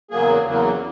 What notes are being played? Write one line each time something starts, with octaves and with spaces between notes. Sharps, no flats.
E2 C#3 F#3 A#3 G#4
E2 C#3 F#3 A#3